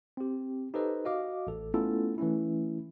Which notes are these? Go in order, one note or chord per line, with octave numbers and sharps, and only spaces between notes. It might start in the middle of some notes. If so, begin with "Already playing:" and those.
C4 G4
D#4 G4 A4 B4 C5 D#5
F#4 D#5 F5 D6
A1 A4
A3 B3 C#4 E4 F4 A4
E3 A3 C#4 E4